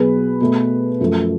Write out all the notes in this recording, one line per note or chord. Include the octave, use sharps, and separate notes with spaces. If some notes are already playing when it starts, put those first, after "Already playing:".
Already playing: B2 F#3 B3 G#4 B4
B2 A3
F#2 F3 A3